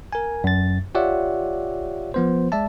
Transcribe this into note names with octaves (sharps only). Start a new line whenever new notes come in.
A#4 G#5
F#2 A6
F4 G4 C#5 D5 E5 F#5
F3 B3 C5
G#3 D5 E5 A5